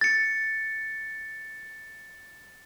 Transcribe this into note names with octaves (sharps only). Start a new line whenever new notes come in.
A6 C#7